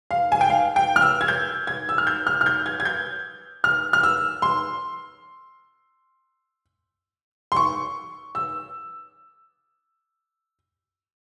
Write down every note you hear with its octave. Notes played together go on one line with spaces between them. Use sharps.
F5
G#5
G5
F5
G5
F6
E6
G#6
G6
G#6
E6
F6
G6
F6
F6
G6
G#6
G#6
G6
F6
F6
E6
C6
C6
C#6
E6